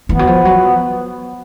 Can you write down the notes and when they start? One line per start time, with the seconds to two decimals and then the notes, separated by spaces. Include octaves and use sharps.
0.09 E3 B3
0.19 F#3
0.27 F3
0.45 F#3